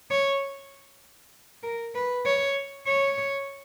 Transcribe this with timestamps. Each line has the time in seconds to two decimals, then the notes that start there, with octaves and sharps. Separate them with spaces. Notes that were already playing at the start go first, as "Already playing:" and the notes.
0.11 C#5
1.63 A#4
1.95 B4
2.25 C#5
2.86 C#5